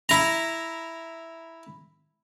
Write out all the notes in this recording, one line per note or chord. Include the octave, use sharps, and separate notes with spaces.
E4 A#5